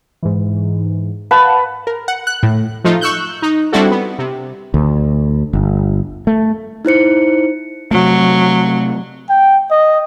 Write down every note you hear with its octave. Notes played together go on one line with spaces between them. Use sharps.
G#2 E3
B4 F5 F#5 A5
A#4
F#5
F#6
A2
F3 A3 D#4 F4
C#6 E6 F#6 G6
D#4
G3 C4 D4 E4 F#4 A4
B3
C3
D2
G1
A3
D#4 E4 C5 C#7
C3 F#3 A3
G5
D#5